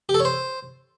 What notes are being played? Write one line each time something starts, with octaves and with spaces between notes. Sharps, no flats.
G4
A4
C#5
C5